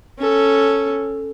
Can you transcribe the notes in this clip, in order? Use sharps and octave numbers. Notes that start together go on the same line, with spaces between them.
C#4 A4